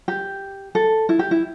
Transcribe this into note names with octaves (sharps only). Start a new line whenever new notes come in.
G4
A4
E4
G4
E4